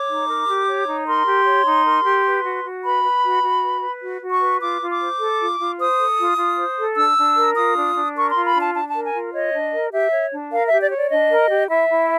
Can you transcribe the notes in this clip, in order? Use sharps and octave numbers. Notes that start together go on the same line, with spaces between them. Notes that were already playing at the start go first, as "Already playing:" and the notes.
Already playing: C#5 D6
D#4
A#4
G4
C#5
D#4
A#4 C6
G4
C#5
D#4
A#4
G4
B4
F#4
F#4
B4 B5
B4
F#4
F#4
B4
B4
F#4
F#4
C#6
B4
F4 D6
F4
D6
C5
A4
F4
F4
C5 D#6
A4
F4
F4
C5
A4
D4 E6
D4
A#4
F4 D#6
D4
D4
A#4 C#6
C6
F4
B5
D4
A5
D4 A5
A5
A#4
G#5
F4
C#5 D#5
D4
A#4
G4 E5
C#5
D4
A#4 F5
E5
G4
D5
C#5
D5
D4 D#5
A#4
G4
E4 E5
E4